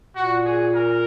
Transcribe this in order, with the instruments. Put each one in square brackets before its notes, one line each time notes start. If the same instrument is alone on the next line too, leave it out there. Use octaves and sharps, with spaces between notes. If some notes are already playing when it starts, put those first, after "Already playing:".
[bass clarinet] A#2 [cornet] F#4
[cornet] G#4
A#4